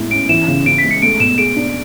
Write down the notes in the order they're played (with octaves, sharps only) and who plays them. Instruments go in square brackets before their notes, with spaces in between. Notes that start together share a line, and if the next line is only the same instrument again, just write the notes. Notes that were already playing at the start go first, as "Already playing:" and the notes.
Already playing: [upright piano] A2 G#3 E4
[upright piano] C#4 [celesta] D7
[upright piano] E3 [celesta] E7
[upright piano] C#3
[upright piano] C#3 [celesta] D7
[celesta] B6
[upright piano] G#3
[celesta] C#7
[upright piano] A3 [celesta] D7
[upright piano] B2 [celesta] E7
[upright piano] G#4 [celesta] D7
[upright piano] D4